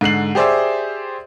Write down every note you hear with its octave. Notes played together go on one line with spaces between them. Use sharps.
G#2 D3 C7 F#7
G4 G#4 C5 D5 E5